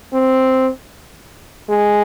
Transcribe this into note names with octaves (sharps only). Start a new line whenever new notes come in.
C4
G#3